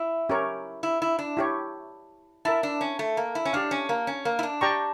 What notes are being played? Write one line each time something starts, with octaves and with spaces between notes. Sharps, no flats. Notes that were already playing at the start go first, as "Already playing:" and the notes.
Already playing: E4
C#4 G4 A#4 C#5
E4
E4
D4
E4 G4 C#5
E4 A#4 E5 A5
D4
C#4
A3
A#3
E4
C#4
D4 G4 D5 F5
C#4
A#3
C#4
A#3
E4
D4
G4 D5 G5 A#5 C#6